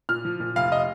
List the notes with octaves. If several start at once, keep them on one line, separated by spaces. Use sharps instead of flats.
A#2 F6
F3
A#2
F1 F5
D#5